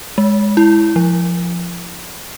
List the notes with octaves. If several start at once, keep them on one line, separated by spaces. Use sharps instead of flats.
G#3
E4
F3